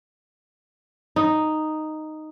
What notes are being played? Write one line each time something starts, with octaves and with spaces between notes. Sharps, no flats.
D#4